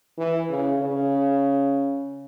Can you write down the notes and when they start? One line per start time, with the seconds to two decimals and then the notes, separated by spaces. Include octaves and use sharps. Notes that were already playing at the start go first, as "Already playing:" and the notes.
0.18 E3
0.49 C#3
0.81 C#3